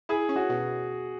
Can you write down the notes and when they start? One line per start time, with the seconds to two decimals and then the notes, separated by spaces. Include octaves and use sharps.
0.09 E4 G#4
0.29 C#4
0.36 F#4
0.49 B2